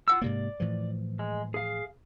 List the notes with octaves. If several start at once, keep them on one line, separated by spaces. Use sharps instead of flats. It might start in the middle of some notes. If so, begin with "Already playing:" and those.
F4 F#5 E6
G#2 C3 A#3 D5
A2 E3 F3
G#3
G#4 F5